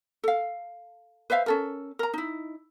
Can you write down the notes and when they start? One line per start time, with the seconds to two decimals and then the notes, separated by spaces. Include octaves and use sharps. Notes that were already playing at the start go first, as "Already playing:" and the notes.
0.24 A4 F5
1.30 B4 C5 E5 F5
1.46 C#4 A4 A#4
1.99 A#4 A#5
2.14 D#4 E4